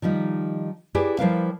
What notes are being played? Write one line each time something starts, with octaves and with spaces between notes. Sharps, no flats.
D#3 F3 G3 D#4
E4 G4 G#4 B4 D5
F3 G3 E4 A#4 B4 F5